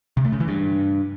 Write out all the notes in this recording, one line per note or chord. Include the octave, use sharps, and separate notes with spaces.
C3
A3
C#3
E3
G2